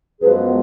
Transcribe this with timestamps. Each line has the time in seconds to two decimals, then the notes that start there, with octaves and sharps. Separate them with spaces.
0.22 F#2 F3 G#3 B3 G#4 B4